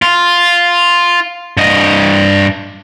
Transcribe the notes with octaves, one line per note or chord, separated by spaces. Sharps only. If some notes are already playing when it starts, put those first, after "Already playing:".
F4
G2 D#5